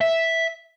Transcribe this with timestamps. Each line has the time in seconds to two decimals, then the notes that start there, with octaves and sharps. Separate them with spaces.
0.01 E5